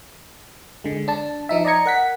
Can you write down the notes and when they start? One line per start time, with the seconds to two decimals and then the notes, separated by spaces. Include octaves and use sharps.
0.84 D3 G#3
1.08 D4 A5
1.49 F3 D#4 E5
1.65 D5 D#5 A#5 G#6 C#7
1.86 A#4 F#5 B6